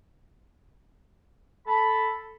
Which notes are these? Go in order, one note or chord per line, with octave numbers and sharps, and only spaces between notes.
A4 B5